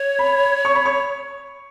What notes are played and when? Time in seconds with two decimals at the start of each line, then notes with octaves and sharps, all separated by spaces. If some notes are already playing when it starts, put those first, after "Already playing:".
Already playing: C#5
0.19 B5
0.65 C#6
0.75 B5
0.85 C#6